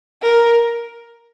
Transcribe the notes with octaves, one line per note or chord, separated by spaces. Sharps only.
A#4